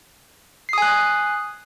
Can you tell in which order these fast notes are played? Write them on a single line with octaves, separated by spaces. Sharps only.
C7 D#6 G#5 F#6